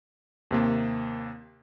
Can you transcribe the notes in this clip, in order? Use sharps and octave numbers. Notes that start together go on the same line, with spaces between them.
D#2 C3 A#3